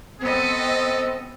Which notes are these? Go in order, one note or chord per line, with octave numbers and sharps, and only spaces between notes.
B3 C4 A4 D#5